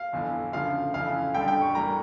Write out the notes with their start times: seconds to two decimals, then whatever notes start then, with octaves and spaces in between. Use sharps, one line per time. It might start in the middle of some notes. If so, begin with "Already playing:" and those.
Already playing: F5
0.13 G1 F2 E3
0.53 D2 C#3 F3 F5
0.94 F2 C#3 E3 F5
1.35 F2 D3 G3 G5
1.48 G5
1.62 C#6
1.75 A2 E3 G3 A#3 A#5